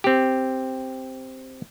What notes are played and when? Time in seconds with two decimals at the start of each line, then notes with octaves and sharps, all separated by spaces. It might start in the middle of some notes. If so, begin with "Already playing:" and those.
0.04 C4 G4